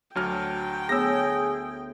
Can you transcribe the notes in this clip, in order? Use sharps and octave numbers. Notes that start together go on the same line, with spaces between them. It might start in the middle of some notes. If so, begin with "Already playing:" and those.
D2 F#3 D4 G5 F6
D2 B3 G#4 C#5 E6 A#6